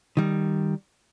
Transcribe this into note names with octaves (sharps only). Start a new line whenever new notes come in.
D#3 G3